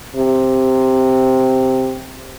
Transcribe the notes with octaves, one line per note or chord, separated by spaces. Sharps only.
C3